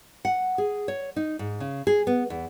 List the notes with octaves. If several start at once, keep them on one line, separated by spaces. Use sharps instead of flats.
F#5
G#4
C#5
D#4
G#2
C#3
G#4
B3
E2